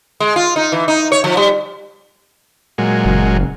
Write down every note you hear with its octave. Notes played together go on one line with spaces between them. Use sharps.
G#3
F4
D#4
E3
D#4
C#5
F3
G3
A#2 F#3 G#3
F#1